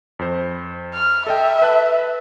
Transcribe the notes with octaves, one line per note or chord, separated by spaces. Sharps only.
F2 C5
F6
A4 D#5 E5 G5
B4 A5 F#6